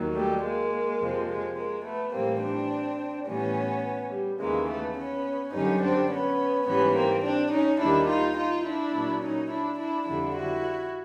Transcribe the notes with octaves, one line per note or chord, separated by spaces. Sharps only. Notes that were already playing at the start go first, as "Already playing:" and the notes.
Already playing: D#2 D#3 F#3
G3 A3
G#3 A#3
F2 C3 F3
G#3
G#3 A#3
A3 B3
A2 E3 G3 A#3 C4
C4 D4
A2 E3 G3 B3 C#4
G3
D#2 C#3 E3 G#3 A#3
A3 B3
B3 C#4
F#2 D3 G3 C#4 D#4
C4 D4
B3 C#4
G#2 E3 G3 B3 C#4
A#3 C4
C4 D4
C#4 D#4
D#2 D#3 G3 D4 E4
D#4 F4
D#4 F4
D4 E4
A#2 F#3
C#4 D#4
D4 E4
D4 E4
F2 D3 G3 D4 E4
E4 F#4